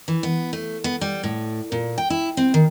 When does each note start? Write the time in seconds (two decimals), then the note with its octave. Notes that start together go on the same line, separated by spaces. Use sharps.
0.08 E3
0.23 B3
0.53 A3
0.84 B3
1.01 G3
1.23 A2
1.72 A#2
1.98 G5
2.10 E4
2.37 C4
2.54 D#3